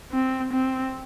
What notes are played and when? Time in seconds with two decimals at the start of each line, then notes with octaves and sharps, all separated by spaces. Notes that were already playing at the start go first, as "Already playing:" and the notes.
0.12 C4
0.53 C4